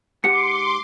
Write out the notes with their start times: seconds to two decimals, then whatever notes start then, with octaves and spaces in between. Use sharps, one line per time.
0.24 G#2 G4 F#5 C6 D6 C#7